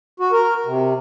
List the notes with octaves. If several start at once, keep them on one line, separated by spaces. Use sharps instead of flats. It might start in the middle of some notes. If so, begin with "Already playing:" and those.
F#4
A#4
C3